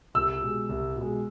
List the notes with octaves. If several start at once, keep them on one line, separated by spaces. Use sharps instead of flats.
C2 E6
B2 G#3
C2
B2 G#3